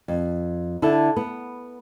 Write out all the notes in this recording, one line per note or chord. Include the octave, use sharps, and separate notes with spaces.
F2
D3 E4 A4
B3